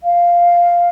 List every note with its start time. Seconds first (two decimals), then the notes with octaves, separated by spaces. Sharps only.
0.03 F5